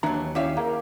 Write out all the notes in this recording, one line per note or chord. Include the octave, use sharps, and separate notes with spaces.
D#2 E3 F#3 D4 E5 A#5
C#4 E4 G4 C#5 D5 E5 F5
A#3 G#4 A#4